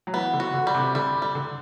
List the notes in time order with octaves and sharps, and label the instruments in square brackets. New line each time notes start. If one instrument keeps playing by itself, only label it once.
[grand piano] F#3
[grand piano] E3 [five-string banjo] B3
[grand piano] D3
[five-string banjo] F#4
[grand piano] D3
[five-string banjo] G3
[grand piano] C3
[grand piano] D3 [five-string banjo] G3
[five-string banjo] G3
[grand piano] D3